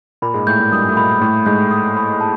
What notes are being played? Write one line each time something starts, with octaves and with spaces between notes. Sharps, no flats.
A#2 A#3 B5
G#2 G#3
A2 A3 G6
A2 A3
G2 G3 D#6
A3
A#2 A#3 B5
A2 A3 B5
G#2 G#3 G6
D#6
B5
A5